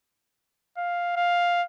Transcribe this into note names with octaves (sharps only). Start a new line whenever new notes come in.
F5
F5